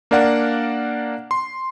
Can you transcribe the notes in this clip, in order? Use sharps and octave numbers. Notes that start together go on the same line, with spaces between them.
A#3 D4 A#4 D5 F5 F#5
C6